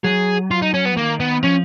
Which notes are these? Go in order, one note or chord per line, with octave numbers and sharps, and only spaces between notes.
F#3 G#4
F4
D#4
C#4
B3
F3
D#3 A#3
B3
F3 C#4